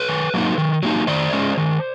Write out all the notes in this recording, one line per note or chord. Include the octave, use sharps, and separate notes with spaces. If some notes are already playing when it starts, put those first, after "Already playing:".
Already playing: B4 C#5
D#3
F#3 A#3 D#4
D#3
F#3 A#3 D#4
D#3 C5 D5
G#3 C#4
D#3